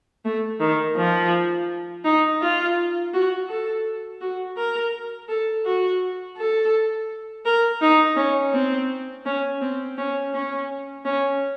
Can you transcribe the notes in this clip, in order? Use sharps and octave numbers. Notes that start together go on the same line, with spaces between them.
A3
D#3
F3
D#4
F4
F#4
A4
F#4
A#4
A4
F#4
A4
A#4
D#4
C#4
C4
C#4
C4
C#4
C#4
C#4